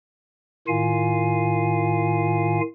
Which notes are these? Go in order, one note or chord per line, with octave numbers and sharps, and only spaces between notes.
A2 D#3 F4 F5 G#5